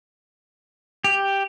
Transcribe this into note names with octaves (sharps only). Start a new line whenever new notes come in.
G4